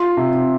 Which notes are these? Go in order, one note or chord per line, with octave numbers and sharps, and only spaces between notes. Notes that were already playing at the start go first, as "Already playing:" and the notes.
Already playing: F4 C6
C3